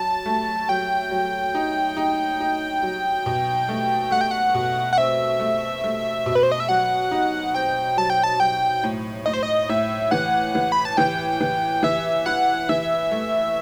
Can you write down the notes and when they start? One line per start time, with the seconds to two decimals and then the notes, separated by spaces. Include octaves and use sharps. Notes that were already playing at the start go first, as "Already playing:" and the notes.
Already playing: F#3 A5
0.26 A3
0.69 F#3 G5
1.11 F#3
1.55 D#4
1.97 D#4
2.40 D#4
2.83 F#3
3.26 B2
3.69 A3
4.11 A3 F#5
4.21 G5
4.31 F#5
4.54 B2
4.93 F#5
4.97 C4 E5
5.40 A3
5.84 A3
6.26 B2
6.35 B4
6.43 C5
6.52 D#5
6.60 E5
6.69 F#3 F#5
7.11 D#4
7.55 C4 G5
7.97 F#3 A5
8.10 G5
8.24 A5
8.40 F#3 G5
8.83 A2
9.26 A2 D#5
9.33 C5
9.43 D#5
9.69 A2 E5
10.11 E3 F#5
10.55 E3
10.72 B5
10.85 A5
10.97 E3 G5
11.41 E3
11.83 E3 E5
12.26 E4 F#5
12.69 E3 E5
13.11 A3